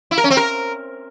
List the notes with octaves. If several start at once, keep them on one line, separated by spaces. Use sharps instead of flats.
E4
A#4
C#4
C4
A#4